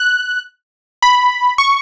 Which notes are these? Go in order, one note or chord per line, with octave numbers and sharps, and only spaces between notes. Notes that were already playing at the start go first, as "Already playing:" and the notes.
Already playing: F#6
B5
C#6